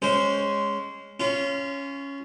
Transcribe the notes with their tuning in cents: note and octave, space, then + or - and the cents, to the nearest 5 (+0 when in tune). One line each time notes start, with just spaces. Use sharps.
G#3 -5 C#4 +0 C5 -15
C#4 +0 F4 -30